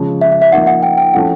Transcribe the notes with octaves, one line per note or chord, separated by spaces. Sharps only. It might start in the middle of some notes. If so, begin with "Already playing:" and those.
Already playing: C#3 F3 G#3
E5
E5
E5
F3 A#3 D#4 F#5
F#5
G5
G5
F3 A3 C#4 E4 F#5